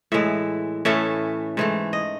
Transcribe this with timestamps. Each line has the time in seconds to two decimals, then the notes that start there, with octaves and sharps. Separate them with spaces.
0.12 A2 E3 G#3 E5
0.85 A2 E3 A3 C#4 E5
1.57 G#2 E3 A3
1.93 D#5